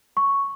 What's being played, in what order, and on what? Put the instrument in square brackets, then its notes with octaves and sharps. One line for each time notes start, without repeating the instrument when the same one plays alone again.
[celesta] C#6